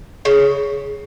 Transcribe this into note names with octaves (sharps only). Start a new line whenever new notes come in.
C#3